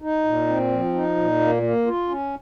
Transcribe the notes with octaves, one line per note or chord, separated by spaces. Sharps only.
D#4
A#2
C4
F3
D#4
A#2
A#3
A#3
F4
C#4